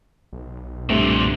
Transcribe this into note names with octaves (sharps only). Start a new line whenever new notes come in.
B1
G2 A#2 D3 A3 C4